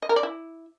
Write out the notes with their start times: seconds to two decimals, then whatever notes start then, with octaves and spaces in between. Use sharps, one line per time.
0.02 D#5
0.09 A#4
0.16 D5
0.23 E4